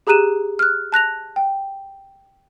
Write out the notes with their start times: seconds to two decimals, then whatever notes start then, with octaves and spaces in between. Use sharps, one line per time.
0.07 G4 G#4 A#5 F#6 D#7 E7
0.59 F6 F#6
0.92 A5 F#6 A#6 F7
1.36 G5